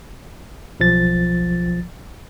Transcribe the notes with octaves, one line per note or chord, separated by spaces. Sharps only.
B1 F3 A6